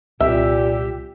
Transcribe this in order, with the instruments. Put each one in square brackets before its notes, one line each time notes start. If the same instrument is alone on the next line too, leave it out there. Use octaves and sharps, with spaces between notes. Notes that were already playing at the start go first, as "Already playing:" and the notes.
[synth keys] C2 E6 B6 [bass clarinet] A#2 [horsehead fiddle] G4 [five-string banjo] E5